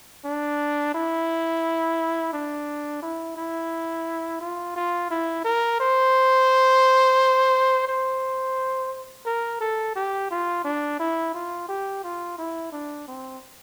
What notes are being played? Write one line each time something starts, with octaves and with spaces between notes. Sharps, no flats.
D4
E4
D4
E4
E4
F4
F4
E4
A#4
C5
C5
A#4
A4
G4
F4
D4
E4
F4
G4
F4
E4
D4
C4